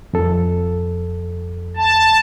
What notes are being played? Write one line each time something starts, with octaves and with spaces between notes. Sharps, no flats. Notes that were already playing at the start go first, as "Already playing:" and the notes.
F2 A4
A5